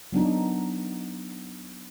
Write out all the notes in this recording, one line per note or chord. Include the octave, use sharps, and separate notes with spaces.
F#3 B3 D4 D#4